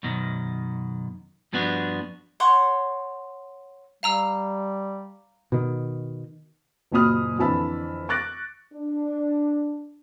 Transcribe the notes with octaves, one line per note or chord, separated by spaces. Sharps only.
F#2 B2 D#3
G2 F3 B3 D4 F#4
C#5 F#5 C6 C#6
G3 F5 A#5 E6
B2 D#3
F#1 F#2 A#2 B5 D#6 F6
F2 D3 E3 A5 B5 E6
C#6 D6 F#6 A6 A#6 D7
D4